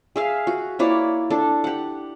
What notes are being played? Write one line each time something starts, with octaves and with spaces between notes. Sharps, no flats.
G#4 E5 F5
F#4
A#3 E4 C#5 D5
D4 A4
G4 F#5